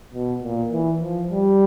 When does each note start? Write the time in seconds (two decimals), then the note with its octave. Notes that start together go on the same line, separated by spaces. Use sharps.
0.13 B2
0.43 A#2
0.71 E3
1.00 F3
1.29 G3